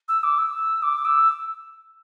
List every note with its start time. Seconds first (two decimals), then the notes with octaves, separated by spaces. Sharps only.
0.08 E6
0.23 D6
0.38 E6
0.83 D6
1.05 E6